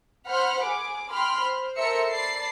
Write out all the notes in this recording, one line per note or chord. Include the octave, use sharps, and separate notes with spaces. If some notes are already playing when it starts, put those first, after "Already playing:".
C5 F#5 B5 F6
G#4 D6
G5 B5 C6 F6
C5
A4 A#4 C5 E5 E6 C#7
D5 A5 B5 A6 C7